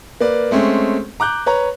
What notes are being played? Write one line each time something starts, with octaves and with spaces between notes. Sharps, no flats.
A#3 B4 D5
G#3 A3 C4 C#4
A#5 D6 F#6 G6
B4 C#5 A#5